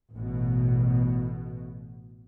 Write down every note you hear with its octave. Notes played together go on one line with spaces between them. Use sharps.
A1 B2